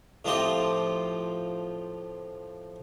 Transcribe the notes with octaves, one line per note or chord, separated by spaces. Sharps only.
A2 F3 C4 F4 G4 D#5